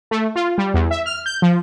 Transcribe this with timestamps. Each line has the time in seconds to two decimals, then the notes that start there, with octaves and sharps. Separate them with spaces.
0.11 A3
0.36 F4
0.58 G3
0.74 E2
0.91 E5
1.06 F6
1.26 G6
1.42 F3